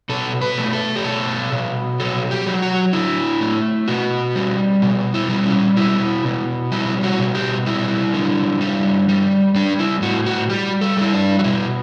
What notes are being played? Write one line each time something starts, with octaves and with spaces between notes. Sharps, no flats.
B2 A4
B4
A3
A4
G4
B2 A4
B2
F#3 A4
G4
F#3
F#4
D3 E4
A3
B2 F#4
G3
B2
E4
G3
C#4
B2 E4
B2
G3 E4
F#4
B2
G4
G3 E4
D3
G3
G3
G3 D4
E4
A2 F#4
F#4
G3 G4
A4
G3 E4
D4
F#4
B2 E4